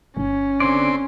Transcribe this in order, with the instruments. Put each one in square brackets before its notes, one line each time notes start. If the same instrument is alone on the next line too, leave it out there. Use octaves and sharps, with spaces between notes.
[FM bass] G1 [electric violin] C#4
[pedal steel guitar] D3 D5 [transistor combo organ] C4